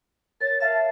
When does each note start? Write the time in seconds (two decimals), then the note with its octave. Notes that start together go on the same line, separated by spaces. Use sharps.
0.41 A#4 C#5 A6
0.61 E5 F5 A5